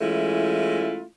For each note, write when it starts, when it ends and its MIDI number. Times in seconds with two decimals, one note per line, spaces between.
0.01 1.04 52
0.01 1.04 56
0.01 1.04 57
0.01 1.04 61
0.01 1.04 64
0.01 1.04 65